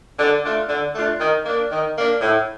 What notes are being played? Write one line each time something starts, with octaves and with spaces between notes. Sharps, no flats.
D3
A3 D4 F4
D3
A3 D4 F4
D#3
A#3 D4
D#3
A#3 D4
A2